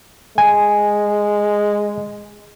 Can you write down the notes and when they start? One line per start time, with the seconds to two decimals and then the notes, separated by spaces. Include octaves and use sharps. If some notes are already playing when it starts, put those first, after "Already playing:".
0.38 G#3 G#5